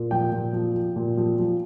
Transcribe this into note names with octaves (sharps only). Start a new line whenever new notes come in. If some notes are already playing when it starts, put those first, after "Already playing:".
Already playing: A#2
F3 G5
A#2
F3
F3
A#2
F3
F3